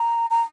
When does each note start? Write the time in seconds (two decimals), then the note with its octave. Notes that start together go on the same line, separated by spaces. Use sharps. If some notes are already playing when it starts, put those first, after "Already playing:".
Already playing: A#5
0.30 A#5